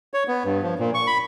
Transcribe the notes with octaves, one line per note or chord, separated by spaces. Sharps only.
C#5
B3
G2
F3
A#2
C#6
B5